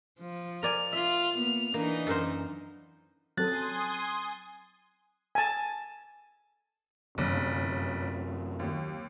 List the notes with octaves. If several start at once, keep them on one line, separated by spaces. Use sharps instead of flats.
F3
A#4 D5 G#5 F7
F4 E5
A#3 B3
E3 A#3 D4 D#4
F#2 A#4 C5
F#3 C4 A4 G#5 C6 D#6 F#6 A6
G#5 A5
G1 F#2 C3
D#2